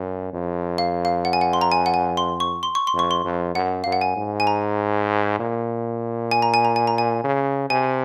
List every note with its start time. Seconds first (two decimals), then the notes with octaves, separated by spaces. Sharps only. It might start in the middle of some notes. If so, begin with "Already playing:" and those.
Already playing: F#2
0.33 F2
0.78 F5
1.05 F5
1.25 F#5
1.33 G#5
1.41 F#5
1.53 C6
1.61 A#5
1.72 G#5
1.86 F#5
1.94 G#5
2.17 C6
2.40 C#6
2.63 C6
2.75 C#6
2.87 C6
2.94 F2
2.99 C#6
3.11 C6
3.25 F2
3.55 F#2 F#5
3.84 F#2 F5
3.92 F#5
4.01 G#5
4.16 G#2
4.40 G#5
4.47 A#5
5.39 A#2
6.31 G#5
6.42 A#5
6.54 G#5
6.65 A#5
6.76 G#5
6.87 A#5
6.98 G#5
7.24 C#3
7.70 C3 G#5